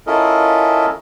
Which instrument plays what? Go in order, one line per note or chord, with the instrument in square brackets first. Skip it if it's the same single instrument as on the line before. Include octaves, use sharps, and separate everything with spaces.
[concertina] C#4 E4 F4 A4 A#4 D#5